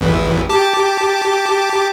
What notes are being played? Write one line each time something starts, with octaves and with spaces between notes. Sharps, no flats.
A1 E2 E3
G4 A5 D6